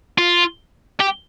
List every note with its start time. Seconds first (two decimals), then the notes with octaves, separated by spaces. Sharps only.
0.18 F4
1.00 G4